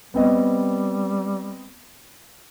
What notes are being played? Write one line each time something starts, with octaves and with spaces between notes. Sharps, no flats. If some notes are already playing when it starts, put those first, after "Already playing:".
G3 B3 C4 D#5